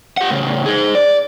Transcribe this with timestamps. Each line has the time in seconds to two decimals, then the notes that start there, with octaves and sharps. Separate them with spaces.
0.17 G4 F#5
0.31 A2 C#3
0.66 D#4 G#4
0.95 D5